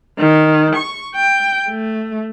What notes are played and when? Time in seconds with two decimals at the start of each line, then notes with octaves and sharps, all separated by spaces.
0.18 D#3
0.76 C#6
1.15 G5
1.69 A3